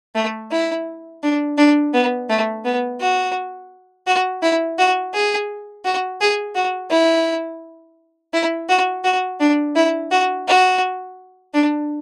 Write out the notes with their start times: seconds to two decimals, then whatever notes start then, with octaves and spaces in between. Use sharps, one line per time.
0.15 A3
0.51 E4
1.23 D4
1.58 D4
1.94 B3
2.29 A3
2.65 B3
3.01 F#4
4.07 F#4
4.43 E4
4.78 F#4
5.14 G#4
5.85 F#4
6.21 G#4
6.55 F#4
6.91 E4
8.33 E4
8.69 F#4
9.04 F#4
9.40 D4
9.76 E4
10.11 F#4
10.48 F#4
11.54 D4